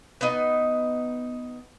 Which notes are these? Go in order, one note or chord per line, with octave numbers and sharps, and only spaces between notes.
B3 D#4 D#5